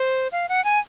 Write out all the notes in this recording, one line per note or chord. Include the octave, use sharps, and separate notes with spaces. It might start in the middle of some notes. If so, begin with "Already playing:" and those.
Already playing: C5
F5
F#5
G#5